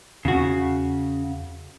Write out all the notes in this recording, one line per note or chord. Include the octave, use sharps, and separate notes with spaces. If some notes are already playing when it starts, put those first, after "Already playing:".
E2 C#3 F#4